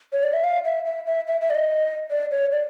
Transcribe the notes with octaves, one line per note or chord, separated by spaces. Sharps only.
C#5
D5
E5
F5
E5
E5
E5
E5
E5
D5
D#5
D5
C#5
D5